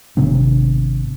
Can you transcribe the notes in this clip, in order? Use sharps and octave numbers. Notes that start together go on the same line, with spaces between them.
G#1 C3 B3 D4